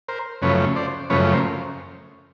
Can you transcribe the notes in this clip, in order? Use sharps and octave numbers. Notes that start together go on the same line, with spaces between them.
A#4 C5
F#2 C#3 F3 A3 C#4 B4 C#5
C5 D5
F#2 C#3 F3 A3 C#4 B4 C#5
A#4 C5